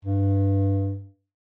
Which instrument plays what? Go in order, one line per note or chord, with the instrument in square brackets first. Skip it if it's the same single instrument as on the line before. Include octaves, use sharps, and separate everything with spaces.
[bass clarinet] G2